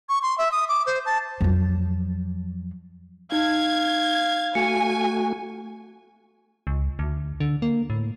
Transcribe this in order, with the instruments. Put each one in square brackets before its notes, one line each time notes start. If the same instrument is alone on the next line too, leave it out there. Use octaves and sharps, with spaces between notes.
[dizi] C#6
C6
E5
D#6
D6
C5
A5
[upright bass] F2 F#3
[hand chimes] D#4 [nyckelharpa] F5 [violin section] G#6
[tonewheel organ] A3 F#4 [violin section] G#5 [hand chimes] C#7
[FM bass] C#2
D2
D3
A#3
A2